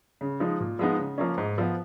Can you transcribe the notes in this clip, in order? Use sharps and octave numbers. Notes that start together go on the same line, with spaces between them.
C#3
F3 G#3 D#4
A#2
F3 G#3 B3 D#4
C#3
F3 A#3 C#4
G#2
F3 B3